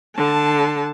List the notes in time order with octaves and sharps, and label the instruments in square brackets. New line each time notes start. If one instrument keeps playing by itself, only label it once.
[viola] D3 A5